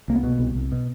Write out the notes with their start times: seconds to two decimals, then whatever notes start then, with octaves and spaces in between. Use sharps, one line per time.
0.08 C2 A#3
0.15 B3
0.24 B2
0.39 C2
0.55 C2
0.72 B2